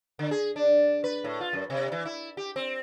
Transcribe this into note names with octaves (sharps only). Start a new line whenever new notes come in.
D3
G#4
D4
B4
A2
F4
F#2
C3
E3
E4
G4
C4